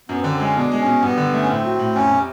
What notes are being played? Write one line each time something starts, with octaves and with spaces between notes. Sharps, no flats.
F#2 B3
C4
D3
C4
G#3 C#4
B2 D4
G#3
C#4
B2
G2 B3
D3
A3
C#4
A2 C4
F#3
A2
F2 C#4
C3